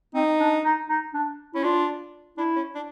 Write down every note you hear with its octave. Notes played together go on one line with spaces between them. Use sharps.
C4 D#4
D4
D#4
D#4
D4
C#4 E4
D4 F4
D4 E4
C#4
D4